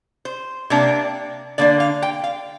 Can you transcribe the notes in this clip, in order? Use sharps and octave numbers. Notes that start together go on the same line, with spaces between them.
C5
C3 A#3 D4
D3 A#3 D4 D5
F5
G5
F5